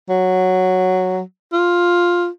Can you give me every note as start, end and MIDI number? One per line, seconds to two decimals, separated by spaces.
0.09 1.20 54
1.53 2.28 65